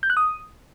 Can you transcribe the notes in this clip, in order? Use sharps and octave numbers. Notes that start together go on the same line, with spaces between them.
G6
F#6
D#6